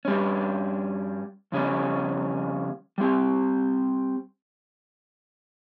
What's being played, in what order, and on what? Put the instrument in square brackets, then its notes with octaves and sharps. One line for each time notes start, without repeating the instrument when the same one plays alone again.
[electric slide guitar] G2 G3 C#4
F2 C#3 G3 C#4
G3 C4 G4